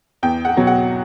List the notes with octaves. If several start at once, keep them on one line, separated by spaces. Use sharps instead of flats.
E2 G5
F#5
B2 F#3
F#5